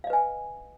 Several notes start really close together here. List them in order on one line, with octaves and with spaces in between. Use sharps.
F5 D#5 B4 G#5